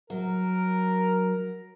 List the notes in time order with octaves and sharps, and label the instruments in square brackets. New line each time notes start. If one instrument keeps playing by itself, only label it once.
[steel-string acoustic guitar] F#3 [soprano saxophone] A#4